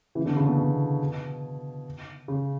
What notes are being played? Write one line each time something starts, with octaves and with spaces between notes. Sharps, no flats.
C#3 E3
B2 D3
C#3
B2
B2
C#3